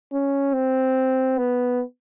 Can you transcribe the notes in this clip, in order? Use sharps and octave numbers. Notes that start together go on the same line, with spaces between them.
C#4
C4
B3